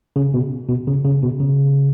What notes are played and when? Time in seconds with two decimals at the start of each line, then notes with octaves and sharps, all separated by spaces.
0.16 C#3
0.34 B2
0.68 B2
0.87 C#3
1.05 C#3
1.23 B2
1.40 C#3